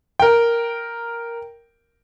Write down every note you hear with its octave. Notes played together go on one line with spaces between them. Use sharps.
A#4 G5